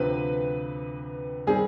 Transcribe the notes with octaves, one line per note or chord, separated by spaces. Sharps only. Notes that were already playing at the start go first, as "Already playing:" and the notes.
Already playing: D2 C3 F3 C4 B4
D#3 G3 C4 G#4